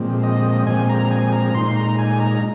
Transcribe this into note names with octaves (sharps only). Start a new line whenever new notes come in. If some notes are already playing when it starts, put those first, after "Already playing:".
Already playing: A#2 F3 G#3 C4
D#5
A#2 F3 G#3 C4 G#5
A#5
G#5
A#5
A#2 G#3 D#4 C6
A#5
G#5
A#5